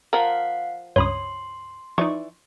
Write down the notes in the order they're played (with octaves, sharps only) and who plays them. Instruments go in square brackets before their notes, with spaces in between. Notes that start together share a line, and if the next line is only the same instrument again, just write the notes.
[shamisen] F3 A#4 [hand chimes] F5 F#5
[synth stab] C#2 G2 [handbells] C#5 B5 D#6 [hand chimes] C6
[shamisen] E3 D5 [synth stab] F3 D#4 [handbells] C#6